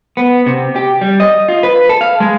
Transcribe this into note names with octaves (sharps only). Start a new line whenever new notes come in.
B3
C3
G4
G3
D#5
F4
B4
A4
F5
G#3